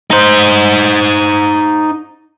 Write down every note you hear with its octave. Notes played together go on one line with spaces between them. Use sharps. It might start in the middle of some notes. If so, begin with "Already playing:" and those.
D#4 C5